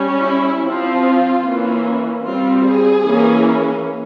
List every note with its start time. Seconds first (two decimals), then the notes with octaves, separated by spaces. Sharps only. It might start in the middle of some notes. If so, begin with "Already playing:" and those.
Already playing: G3 C#4
0.22 E4
0.62 F3 C4 F4
1.43 E3 A#3 C#4
2.24 G3 C4 F4
2.65 G#4
3.05 E3 A#3 C#4